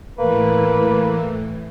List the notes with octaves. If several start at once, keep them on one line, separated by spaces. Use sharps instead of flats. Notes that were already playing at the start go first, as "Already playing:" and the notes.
A2 E3 A#3 B4